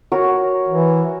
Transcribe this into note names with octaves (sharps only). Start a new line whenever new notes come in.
F#4 A#4 C#5
E3